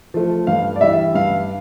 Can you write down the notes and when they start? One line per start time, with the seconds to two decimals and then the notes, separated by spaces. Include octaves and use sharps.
0.14 F3 A3
0.47 G2 F5
0.76 D5
0.81 E3 G3 E5
1.15 G2 F5